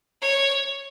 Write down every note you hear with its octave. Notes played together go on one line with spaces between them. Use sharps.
C#5